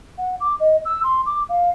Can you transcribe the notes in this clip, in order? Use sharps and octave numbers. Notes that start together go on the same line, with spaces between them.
F#5
D6
D#5
E6
C6
D6
F5